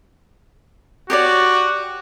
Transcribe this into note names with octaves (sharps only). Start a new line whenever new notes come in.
F#4 G4 C#5 D5